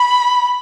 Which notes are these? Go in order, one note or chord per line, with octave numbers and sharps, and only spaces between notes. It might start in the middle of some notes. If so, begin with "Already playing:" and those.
Already playing: B5